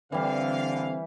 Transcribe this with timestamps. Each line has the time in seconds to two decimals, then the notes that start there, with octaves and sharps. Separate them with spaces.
0.12 D3 E3 G3 C4 F5